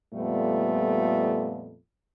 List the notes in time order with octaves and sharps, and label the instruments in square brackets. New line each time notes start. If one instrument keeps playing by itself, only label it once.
[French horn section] F2 A#2 G3 A3 B3